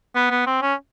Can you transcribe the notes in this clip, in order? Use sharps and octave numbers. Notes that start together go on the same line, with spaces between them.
B3
B3
C4
C#4